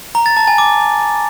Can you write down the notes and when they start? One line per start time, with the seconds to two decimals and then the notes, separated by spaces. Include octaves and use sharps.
0.15 A#5
0.26 A6
0.37 A5
0.47 G#5
0.58 D6